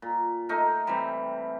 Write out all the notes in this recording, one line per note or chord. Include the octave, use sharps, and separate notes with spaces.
A#2
A3 D#4 A#4
C3 E3 G3